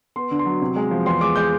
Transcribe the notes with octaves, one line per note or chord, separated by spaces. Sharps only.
B3 C6
D3
C6
F#3
C3
G#3
F3
E2 C6
G#3 D6
G#3 G6